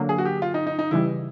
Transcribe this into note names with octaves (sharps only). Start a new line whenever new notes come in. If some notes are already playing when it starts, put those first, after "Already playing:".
Already playing: D3 F#3 A#3
G#4
F#4
G4
F4
D#4
D#4
D#4
C#3 E3 G3 E4